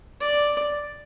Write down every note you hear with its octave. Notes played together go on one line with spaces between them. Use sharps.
D5